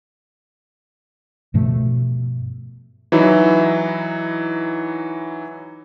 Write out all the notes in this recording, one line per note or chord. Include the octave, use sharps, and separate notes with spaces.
G2 B2 F3 A3
E3 F#3 D#4 E4